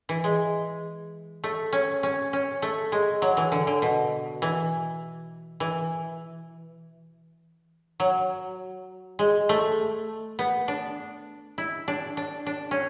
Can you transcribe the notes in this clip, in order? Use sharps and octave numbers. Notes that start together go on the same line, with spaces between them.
E3
G#3
A3
C#4
C#4
C#4
A3
G#3
F#3
E3
D3
D3
B2
E3
E3
F#3
G#3
A3
B3
D4
E4
D4
D4
D4
C#4